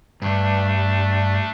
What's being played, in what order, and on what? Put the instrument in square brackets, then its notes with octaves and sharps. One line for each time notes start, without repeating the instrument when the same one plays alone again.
[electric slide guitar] G2 [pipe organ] A3 D4